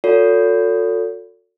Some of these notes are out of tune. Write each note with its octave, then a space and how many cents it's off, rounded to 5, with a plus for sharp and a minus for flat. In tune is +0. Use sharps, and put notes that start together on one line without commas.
F#4 -40 A4 +30 C#5 +40